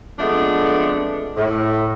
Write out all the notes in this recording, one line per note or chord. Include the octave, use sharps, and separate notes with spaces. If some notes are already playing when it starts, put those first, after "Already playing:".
F2 G#3 A3 B3 D4
A2